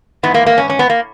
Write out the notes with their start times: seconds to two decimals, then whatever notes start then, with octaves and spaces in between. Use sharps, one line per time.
0.23 G#2 E3 B3
0.34 A#3
0.46 A#3
0.58 C#4
0.70 C#4
0.79 B3
0.90 A#3